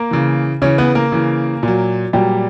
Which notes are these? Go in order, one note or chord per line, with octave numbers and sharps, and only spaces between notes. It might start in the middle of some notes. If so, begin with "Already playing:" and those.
Already playing: A#3 A#4
C#3 E3
C#3 E3 C#4 C#5
B3 B4
A#3 A#4
C#3 E3
A#2 F#3
A#2 F#3 G3 G4